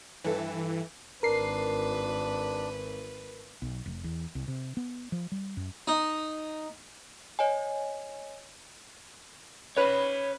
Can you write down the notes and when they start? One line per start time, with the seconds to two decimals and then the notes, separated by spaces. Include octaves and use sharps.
0.24 G2 E3 A4
1.23 G#1 D4 A#4 B4 C7
3.62 B1
3.86 F1
4.04 E2
4.35 C2
4.48 C3
4.77 B3
5.12 F3
5.32 G3
5.57 F#2
5.88 D#4
7.39 C#5 D#5 G#5
9.76 C#4 B4 C#5 B5